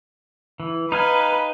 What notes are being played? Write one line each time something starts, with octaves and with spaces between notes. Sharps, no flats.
E3
D#4 B4 F5 G#5